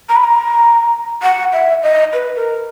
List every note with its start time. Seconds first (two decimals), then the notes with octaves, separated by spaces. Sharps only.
0.09 A#5
0.16 B5
0.24 A#5
1.23 F#5
1.53 E5
1.83 D#5
2.13 B4
2.36 A#4